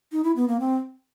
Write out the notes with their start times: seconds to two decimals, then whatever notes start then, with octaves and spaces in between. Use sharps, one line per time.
0.12 D#4
0.24 E4
0.36 B3
0.48 A#3
0.60 C4